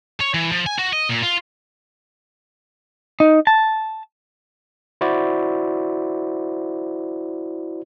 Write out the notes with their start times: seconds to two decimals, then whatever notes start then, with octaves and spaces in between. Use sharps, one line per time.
0.21 C#5
0.34 E3
0.52 F3
0.66 G#5
0.78 F#4
0.93 D#5
1.09 A#2
1.23 F4
3.20 D#4
3.47 A5
5.01 E4 F#4 C5 D5